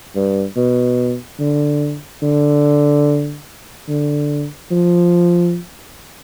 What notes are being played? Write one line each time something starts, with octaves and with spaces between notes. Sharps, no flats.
G2
B2
D3
D3
D3
F3